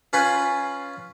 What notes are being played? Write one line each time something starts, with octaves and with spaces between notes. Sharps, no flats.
C#4 F4 B4 G#5 B5 C6